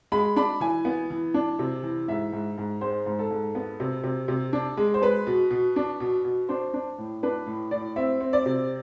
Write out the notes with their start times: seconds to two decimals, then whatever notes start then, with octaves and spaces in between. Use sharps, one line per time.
0.12 G#3 B5
0.36 D4 B5
0.60 E3 G#5
0.85 B3
1.10 E3
1.34 D4
1.59 C3
1.83 E3
2.08 G#2 E5
2.33 G#2
2.58 G#2
2.81 G#3 C5
3.06 G#2
3.19 A4
3.30 G#2
3.55 B3
3.80 C3
4.04 C3
4.28 C3
4.53 D4
4.77 G#3
4.94 C5
5.02 G#3 B4
5.27 B2
5.51 B2
5.76 D4
6.00 B2
6.25 B2
6.49 D4 C5
6.74 D4
6.98 A2
7.23 D4 B4
7.47 A2
7.71 A2 D5
7.96 C4 E5
8.21 C4
8.33 D5
8.46 C3